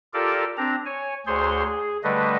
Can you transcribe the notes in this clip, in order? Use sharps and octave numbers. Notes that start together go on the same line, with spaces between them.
F4 G4 A4 A#4 D5
C4 D4 A#5
C#5 G#5
D2 G#4 C5 C#5 C6
G#4
D3 G3 A3 B4 D#5